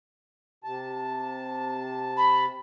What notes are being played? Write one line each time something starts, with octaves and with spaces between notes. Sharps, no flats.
C3 A5
B5